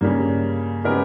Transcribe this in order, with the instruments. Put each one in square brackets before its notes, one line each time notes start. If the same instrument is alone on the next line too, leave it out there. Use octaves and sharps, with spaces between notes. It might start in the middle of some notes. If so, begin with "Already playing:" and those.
[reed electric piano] G2 [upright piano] C#3 G3 A#3
[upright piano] C#3 G#3 B3 G4 A#4